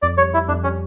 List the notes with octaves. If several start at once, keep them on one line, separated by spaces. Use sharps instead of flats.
F2 D5
G3 C#5
G3 E4
F2 D4
G3 C#4